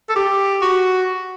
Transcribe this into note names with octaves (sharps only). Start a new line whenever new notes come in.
A4
G4
F#4